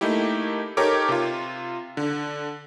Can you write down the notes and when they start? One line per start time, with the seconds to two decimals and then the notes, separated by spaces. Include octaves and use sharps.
0.01 A3 A#3 D#4 E4 G4
0.77 D#4 G4 A4 A#4 C#5 D6
1.09 C3 F4
1.97 D3